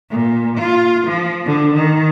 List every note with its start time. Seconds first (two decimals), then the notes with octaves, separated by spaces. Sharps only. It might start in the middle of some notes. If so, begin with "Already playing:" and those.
0.10 A#2
0.58 F4
1.08 F3
1.46 D3
1.75 D#3